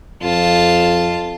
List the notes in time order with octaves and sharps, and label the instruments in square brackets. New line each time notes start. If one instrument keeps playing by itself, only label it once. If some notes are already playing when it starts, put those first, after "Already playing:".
[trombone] F2 [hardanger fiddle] F4 A5